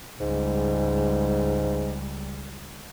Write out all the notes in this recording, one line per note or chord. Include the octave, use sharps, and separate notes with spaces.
C#2 G#2 G3